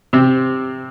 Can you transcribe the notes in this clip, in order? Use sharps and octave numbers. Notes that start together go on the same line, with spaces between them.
C3 C4